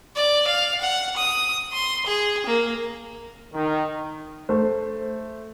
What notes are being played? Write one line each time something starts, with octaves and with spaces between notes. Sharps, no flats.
D5
F5
F#5
D#6
C6
G#4
A#3
D#3
A3 C5